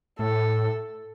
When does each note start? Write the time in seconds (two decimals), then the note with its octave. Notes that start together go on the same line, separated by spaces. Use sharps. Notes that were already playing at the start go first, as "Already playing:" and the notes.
0.19 A2 A4